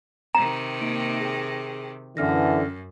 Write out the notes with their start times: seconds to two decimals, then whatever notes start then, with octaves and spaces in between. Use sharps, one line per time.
0.35 C3 D#3 A#5
0.81 A#3 D#4 D7
1.20 G#4 G5
2.17 F#2 D3 E3 C#4 F6 A#6